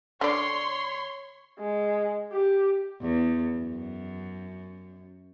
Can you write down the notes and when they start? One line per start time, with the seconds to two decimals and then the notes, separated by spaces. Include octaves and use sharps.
0.21 D3 C#5 D5 C6
1.59 G#3
2.33 G4
3.02 E2
3.58 F#2